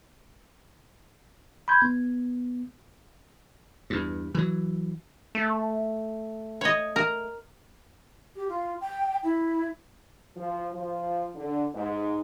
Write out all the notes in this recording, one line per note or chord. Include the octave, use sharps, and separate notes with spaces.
B5 C6 G6 G#6
B3
E2 G2
E3 F#3
A3
C#5 D#5
A#4
G4
F4
G5
E4
F3
F3
D3
G#2